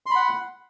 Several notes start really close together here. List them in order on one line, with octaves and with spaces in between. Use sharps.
C6 B5 F#5